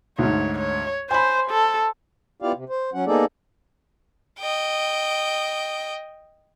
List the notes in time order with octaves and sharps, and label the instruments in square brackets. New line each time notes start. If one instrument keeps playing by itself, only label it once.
[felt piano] D2 G#2 [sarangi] C#5
[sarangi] C#5
[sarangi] C5 [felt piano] G#5 B5
[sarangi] A4
[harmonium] B3 E4 F4 G4 D5 F5
C3
C5
F#3 C#4 F#5
A#3 B3 D#4 G#4 A4 D5
[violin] D#5 G5